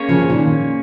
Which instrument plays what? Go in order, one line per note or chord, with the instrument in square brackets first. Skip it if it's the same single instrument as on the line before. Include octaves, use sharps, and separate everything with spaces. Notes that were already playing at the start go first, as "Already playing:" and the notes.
Already playing: [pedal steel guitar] A#3 C#4 G#4 C#5
[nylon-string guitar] C#3 F3
C#3
A#2 D#3